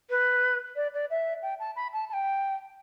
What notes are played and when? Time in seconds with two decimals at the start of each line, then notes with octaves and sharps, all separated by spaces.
0.10 B4
0.76 D5
0.94 D5
1.10 E5
1.42 G5
1.59 A5
1.76 B5
1.93 A5
2.09 A5
2.13 G5